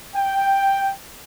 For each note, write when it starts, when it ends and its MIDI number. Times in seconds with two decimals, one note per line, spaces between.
0.16 0.90 79